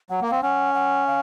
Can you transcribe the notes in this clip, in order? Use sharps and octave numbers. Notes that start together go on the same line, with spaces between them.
F#3 F#5
A#3
C4 F5
C#4 F#5
F#5
F5